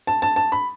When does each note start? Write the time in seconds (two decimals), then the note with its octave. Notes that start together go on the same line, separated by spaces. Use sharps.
0.07 A5
0.22 A5
0.36 A5
0.52 B5